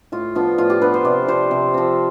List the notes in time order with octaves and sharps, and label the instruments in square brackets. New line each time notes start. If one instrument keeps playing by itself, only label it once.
[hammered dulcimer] A2 F4
F3 B3 D4 F4
A2 F4
G4
F3 B3 D4 B4
C5
C3 D5
F3 C4 C5
C3
F3 C4